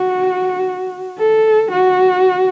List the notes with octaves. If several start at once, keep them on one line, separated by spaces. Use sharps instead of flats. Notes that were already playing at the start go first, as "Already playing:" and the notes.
Already playing: F#4
A4
F#4